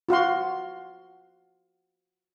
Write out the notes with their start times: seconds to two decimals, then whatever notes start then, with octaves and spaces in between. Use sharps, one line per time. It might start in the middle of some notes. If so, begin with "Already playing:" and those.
0.09 F4 F#4 F5 C6